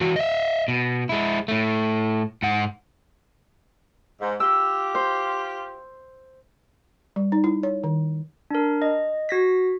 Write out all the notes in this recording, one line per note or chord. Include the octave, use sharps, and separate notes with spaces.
E3 F#4
D#5 E5
B2
G#3 E4
A2 A3
G#2 F#5
G#2
F4 G4 E6
C5
G3
D#4
E4
C#5
D#3
D4 A#4
D#5
F#4 A#6 B6